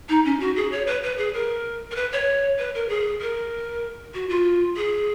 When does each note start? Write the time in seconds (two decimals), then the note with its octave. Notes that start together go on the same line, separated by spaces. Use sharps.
0.09 D#4
0.25 C#4
0.40 F#4
0.56 G#4
0.72 C#5
0.87 B4
1.03 B4
1.18 G#4
1.34 A#4
1.91 A#4
1.96 B4
2.12 C#5
2.59 B4
2.75 A#4
2.89 G#4
3.21 A#4
4.14 F#4
4.29 F4
4.77 G#4